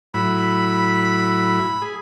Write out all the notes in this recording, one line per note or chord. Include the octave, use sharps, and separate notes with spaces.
A2 F#3 E4 B5
G#4